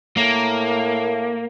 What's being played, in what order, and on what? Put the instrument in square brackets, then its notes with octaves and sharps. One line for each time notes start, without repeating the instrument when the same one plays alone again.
[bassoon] A2 [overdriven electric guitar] A#3